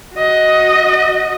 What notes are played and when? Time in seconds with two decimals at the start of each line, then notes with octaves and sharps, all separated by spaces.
0.16 F#4 D#5